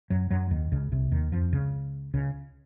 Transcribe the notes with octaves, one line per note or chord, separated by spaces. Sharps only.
F#2 F#3
F#2 F#3
D#2 D#3
C#2 C#3
C2 C3
D#2 D#3
F2 F3
C#2 C#3
C#2 C#3